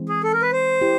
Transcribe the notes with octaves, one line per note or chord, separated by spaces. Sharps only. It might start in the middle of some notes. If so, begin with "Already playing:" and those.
Already playing: E3 G#3 C4
G#4
A4
A#4
B4
C5
E4 G4